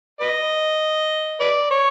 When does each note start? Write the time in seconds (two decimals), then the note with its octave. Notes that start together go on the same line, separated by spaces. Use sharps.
0.21 B4 D#5
1.40 B4 D5
1.71 C#5